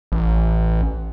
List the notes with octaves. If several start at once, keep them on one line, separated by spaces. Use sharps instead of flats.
A1